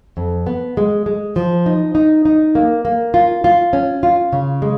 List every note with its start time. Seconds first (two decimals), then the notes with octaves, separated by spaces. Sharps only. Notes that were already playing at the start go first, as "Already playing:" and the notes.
0.17 F2
0.47 B3
0.77 G#3
1.06 G#3
1.36 F3
1.66 D#4
1.95 D#4
2.25 D#4
2.55 A#3
2.85 A#3
3.14 F4
3.44 F4
3.73 C#4
4.03 F4
4.33 C#3
4.62 G#3